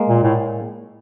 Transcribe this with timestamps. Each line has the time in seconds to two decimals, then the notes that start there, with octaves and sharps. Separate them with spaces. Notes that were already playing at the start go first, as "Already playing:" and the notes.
Already playing: G#3 A#3
0.09 A#2
0.23 A2